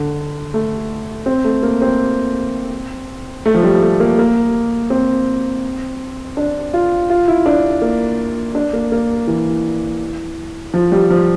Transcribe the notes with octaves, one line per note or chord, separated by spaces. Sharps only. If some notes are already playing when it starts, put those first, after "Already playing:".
Already playing: D3
A3
C4
A3
A#3
C4
A3
F3
G3
A3
A#3
A#3
C4
D4
F4
F4
E4
D4
A#3
D4
A#3
A#3
E3
F3
G3
F3